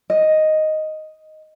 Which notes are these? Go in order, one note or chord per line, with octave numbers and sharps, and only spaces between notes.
D#5